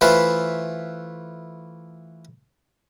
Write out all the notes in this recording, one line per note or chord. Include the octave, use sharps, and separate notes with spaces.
E3 A3 F4 B4 C5